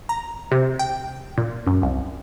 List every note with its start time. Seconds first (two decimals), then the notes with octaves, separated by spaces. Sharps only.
0.09 A#5
0.51 C3
0.79 G5
1.38 A#2
1.67 F#2
1.82 C2